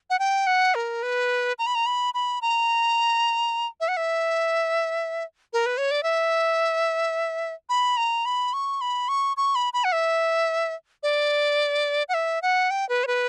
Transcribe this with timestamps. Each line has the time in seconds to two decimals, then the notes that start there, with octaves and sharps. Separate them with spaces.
0.10 F#5
0.19 G5
0.47 F#5
0.75 A#4
1.03 B4
1.59 A#5
1.67 B5
1.75 A#5
1.86 B5
2.14 B5
2.42 A#5
3.81 E5
3.88 F#5
3.97 E5
5.53 A#4
5.66 B4
5.78 C#5
5.91 D5
6.03 E5
7.69 B5
7.97 A#5
8.26 B5
8.53 C#6
8.81 B5
9.09 C#6
9.37 C#6
9.55 B5
9.73 B5
9.84 F#5
9.92 E5
11.03 D5
12.09 F#5
12.14 E5
12.42 F#5
12.71 G5
12.89 B4
13.04 C#5
13.07 B4